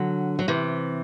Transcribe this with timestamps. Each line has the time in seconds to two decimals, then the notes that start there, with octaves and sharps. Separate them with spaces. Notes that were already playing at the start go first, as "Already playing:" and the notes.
Already playing: D3 F#3
0.39 F#3
0.48 C3 E3